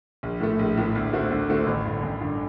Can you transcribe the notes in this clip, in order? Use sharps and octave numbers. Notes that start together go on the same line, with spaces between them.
A#1
A2 A3
A#1
A2 A3
D2
D3 A3 C4 F#4
D2
D3 A3 C4 F#4
A1
G2 D3
A1
G2 D3